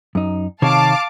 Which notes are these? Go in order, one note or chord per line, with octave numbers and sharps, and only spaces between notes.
F#2 D#4
C3 D#3 C#5 F5 A5 D6